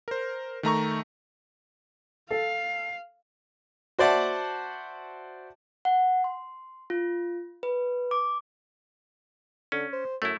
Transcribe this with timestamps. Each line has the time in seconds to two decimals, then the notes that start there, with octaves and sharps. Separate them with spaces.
0.08 A#4 C5
0.63 D#3 A3 A#5 C#6
2.31 A4 F5 C7
3.99 F#4 C5 D5 E5 F#5 A5
5.85 F#5
6.24 C6
6.90 F4
7.63 B4
8.11 D6
9.72 D3 C#4
9.93 C5
10.22 F#2 A3 E4